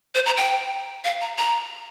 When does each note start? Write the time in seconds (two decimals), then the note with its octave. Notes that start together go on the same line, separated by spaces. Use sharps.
0.15 C5
0.26 A#5
0.37 G5
1.04 F5
1.21 A#5
1.38 A#5